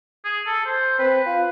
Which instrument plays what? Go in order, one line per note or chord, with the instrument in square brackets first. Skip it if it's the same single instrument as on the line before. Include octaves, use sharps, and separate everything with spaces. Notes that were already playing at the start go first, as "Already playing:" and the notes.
[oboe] G#4
A4
C5
[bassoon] C4 [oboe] B4
[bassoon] F4